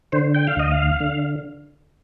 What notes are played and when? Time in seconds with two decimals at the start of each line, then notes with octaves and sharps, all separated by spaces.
0.12 D3 C5
0.34 G5
0.47 F5
0.56 D2 D#5
0.71 F5
1.00 D3